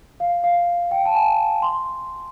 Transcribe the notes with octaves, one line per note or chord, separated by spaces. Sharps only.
F5
F5
G5
A5
G#5
C6